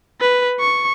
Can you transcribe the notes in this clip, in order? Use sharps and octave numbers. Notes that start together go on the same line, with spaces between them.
B4
C#6